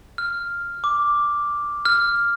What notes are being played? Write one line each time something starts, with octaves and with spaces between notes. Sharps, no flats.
F6
D6
F6